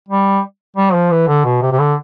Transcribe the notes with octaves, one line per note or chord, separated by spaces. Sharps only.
G3
G3
F3
E3
D3
B2
C3
C3
D3